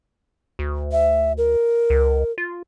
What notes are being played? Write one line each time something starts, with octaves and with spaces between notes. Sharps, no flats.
D2
E5
A#4
C#2
F4